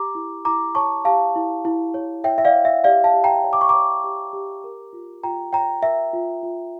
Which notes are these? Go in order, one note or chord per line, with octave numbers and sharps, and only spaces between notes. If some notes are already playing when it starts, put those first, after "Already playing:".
Already playing: G4 A#5 D6
E4
E4 A#5 D6
C#5 A5 C#6
G4 F5 A5
E4
E4
C#5
C#5 E5 G5
E5
D5 F5
C#5
E5
G4 D5 F5
F5 A5
G4
G5 A#5
C#5
D6
C#6
A#5 D6
C#5
G4
G4
A#4
F4
F4 G5 A#5
C#5 G5 A#5
A#4 E5
F4
F4